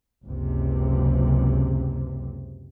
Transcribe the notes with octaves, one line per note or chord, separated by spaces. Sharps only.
F#1 C#2 C3